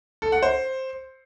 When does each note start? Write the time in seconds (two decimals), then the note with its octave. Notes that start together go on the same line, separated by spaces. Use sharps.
0.22 A4
0.32 F#5
0.43 C5